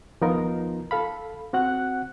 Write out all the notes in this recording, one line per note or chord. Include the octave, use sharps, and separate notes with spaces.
D#2 F3 B3 D#4 F4 A#4
A4 F5 B5
C4 F#4 F#5 F#6